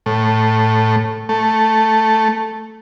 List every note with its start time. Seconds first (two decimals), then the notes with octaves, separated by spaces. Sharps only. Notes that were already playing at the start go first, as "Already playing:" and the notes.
0.06 A2
1.29 A3